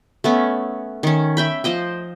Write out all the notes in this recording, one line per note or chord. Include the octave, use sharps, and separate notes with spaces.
A3 B3 C#4
D#3 C#4
E5 G5 B5
F3 C5 D#5 G5